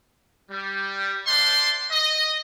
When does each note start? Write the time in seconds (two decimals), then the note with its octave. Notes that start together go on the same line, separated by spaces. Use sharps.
0.51 G3
1.27 C5 D5 E5 F#5 A5 C6
1.91 D#5